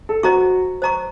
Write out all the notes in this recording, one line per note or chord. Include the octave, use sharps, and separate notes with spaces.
A4
F#4 C5 D#5 A#5 C#6
C5 D#5 A#5 C#6